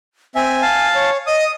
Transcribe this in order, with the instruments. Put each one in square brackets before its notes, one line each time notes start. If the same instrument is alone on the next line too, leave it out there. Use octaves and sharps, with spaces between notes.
[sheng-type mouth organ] C4 E5 [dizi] G#5
[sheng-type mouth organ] F5 A5
[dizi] C#5
[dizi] D#5 [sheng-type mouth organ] D#6